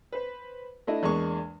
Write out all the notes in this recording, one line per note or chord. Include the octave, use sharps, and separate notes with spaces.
B4 C5
A3 D4 E4 D#5
E2 G#3 A#3 D4 C#6